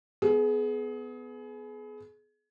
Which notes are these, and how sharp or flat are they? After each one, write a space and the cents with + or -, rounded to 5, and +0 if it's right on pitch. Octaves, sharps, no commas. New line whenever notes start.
B3 +15 G#4 +30